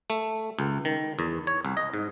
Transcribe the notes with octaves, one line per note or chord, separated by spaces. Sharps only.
A3
C#2
D#3
E2
C#5
C2
D#5
G#2